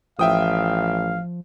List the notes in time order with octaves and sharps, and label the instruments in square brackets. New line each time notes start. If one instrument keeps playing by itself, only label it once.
[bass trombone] A1 [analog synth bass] F3 [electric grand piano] E5 G5 D#6 [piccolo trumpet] F5